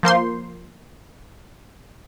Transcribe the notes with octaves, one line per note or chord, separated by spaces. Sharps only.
F3 A#3 C5 C6